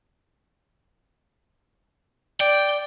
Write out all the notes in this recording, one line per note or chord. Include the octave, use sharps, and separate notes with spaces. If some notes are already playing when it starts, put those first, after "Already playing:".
D5 G5